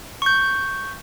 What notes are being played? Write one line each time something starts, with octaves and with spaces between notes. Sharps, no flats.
C#6 G6